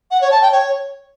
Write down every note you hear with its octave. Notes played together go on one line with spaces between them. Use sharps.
F#5
C#5
A5
G5
C#5